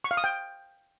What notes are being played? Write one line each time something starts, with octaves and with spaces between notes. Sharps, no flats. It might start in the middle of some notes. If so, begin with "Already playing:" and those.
C#6
F5
D#6
G5